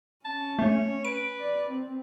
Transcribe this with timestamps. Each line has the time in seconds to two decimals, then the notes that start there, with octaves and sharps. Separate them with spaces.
0.25 C#4 A5
0.59 A3 C#5
1.05 B4 D7
1.40 D5
1.70 C4